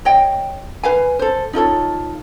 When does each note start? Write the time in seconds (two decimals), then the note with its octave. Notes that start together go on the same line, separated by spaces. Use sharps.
0.05 C#5 D#5 G5
0.83 B4 F5 G#5
1.19 A4 C5
1.53 D#4 F4 A4 C#5